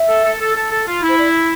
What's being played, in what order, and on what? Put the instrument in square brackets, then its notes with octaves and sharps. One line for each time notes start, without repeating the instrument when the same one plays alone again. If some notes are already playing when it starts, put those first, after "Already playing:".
Already playing: [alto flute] E5
[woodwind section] A4
A4
A4
A4
A4
F4
E4
[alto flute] C5
D5